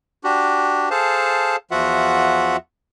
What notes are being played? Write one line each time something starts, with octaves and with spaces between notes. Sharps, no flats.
D4 F#4 G4
G#4 A4 C5 F5 A5
E2 F3 F4 F#4 E5 F#5